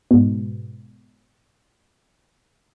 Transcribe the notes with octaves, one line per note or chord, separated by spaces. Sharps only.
G#2 B2